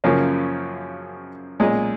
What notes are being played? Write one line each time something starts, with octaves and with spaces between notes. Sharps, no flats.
F#2 C#3 F3 A#3 C#4
B1 A#2 G#3 C#4 G#4